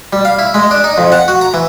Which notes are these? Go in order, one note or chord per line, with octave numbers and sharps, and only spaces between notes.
G3
F5
E4
G#3
D4
D#4
F2
F#5
F#4
A#5
E3